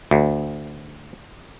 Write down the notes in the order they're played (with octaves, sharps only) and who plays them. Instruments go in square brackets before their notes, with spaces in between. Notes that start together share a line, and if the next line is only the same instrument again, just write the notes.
[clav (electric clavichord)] D2